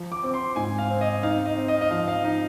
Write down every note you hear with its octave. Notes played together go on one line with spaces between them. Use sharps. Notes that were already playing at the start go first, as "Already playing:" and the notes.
Already playing: F3
D6
C4 D6
C6
G#2 G#5
F5
C4
D#5
D#4 F5
D#5
C4
D#5
D#5
F3 F5
F5
D#4